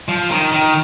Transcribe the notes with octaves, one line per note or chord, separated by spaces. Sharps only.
F3
D#3
D#3